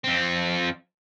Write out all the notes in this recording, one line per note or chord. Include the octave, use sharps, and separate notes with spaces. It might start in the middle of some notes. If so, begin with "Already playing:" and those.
F2 C4